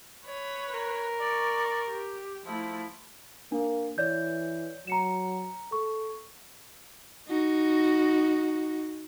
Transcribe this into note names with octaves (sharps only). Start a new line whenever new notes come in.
B4 C#5
A#4
D5 C#6
G4
F3 A3 E4
A#3 D4
E3 C#5 D5 G6
F#3 A#5 C#7 E7
A4 C#6
D#4 F#4